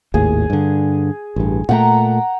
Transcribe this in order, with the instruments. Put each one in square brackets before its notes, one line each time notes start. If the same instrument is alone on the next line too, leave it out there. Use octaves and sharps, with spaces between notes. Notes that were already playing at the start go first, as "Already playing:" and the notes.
[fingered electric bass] G#1 D#2 A2 [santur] G#4
[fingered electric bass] G2 D3
A1 G2
[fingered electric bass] A#2 A3 [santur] F#5 G5 A#5